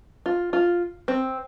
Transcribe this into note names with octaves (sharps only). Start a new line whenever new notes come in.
F4
F4
C4